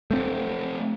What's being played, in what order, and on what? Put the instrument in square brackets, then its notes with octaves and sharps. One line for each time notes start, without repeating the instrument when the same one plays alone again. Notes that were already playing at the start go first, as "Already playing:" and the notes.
[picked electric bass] A3 C4